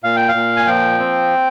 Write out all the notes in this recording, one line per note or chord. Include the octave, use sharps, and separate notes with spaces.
A#2 F5
G5
F5
A#2
G#5
F3 G5
C4